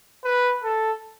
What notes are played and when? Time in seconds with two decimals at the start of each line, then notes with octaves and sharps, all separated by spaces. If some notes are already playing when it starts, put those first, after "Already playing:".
0.24 B4
0.64 A4